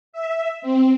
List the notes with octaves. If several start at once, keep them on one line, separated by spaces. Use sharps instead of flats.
E5
C4